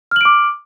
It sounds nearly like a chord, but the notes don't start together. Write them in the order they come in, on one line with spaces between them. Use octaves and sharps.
F6 F#7 D7 D6